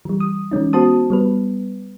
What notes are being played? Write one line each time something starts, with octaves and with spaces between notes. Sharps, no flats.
E3 G3
D#6
E3 G#3 C#4 D#4
B3 F#4 C5 A5 D#6
G3 B3 B4